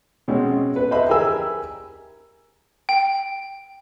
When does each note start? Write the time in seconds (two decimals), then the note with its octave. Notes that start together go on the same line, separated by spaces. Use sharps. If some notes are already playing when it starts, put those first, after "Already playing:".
0.28 B2 G#3 C4 C#4
0.76 B4
0.91 B4 C5 D#5 E5 B5
1.09 G4 G#4 A#4 G#5 E6
2.89 G5